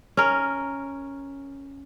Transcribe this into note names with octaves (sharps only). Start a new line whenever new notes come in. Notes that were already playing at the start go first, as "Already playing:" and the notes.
C#4 A#4